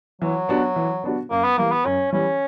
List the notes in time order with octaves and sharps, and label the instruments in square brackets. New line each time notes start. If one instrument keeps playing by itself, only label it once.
[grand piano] E3 [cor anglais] F#3
[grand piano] B3 D4 F#4
E3
B3 D4 F#4
[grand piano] F#2 [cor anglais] A#3
[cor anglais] B3
[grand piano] E3 G3 [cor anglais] A#3
[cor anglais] B3
[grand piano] F#2 [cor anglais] C#4
[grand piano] E3 G3 [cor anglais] C#4